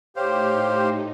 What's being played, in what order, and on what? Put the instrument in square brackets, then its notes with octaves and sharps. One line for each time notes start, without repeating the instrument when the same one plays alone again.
[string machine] A2 D#4 [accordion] G4 [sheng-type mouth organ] C5 F5 [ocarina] C#5